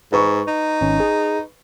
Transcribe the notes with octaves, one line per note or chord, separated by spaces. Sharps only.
G#2 B4 C#6
D#4
G#1 C#4
G#4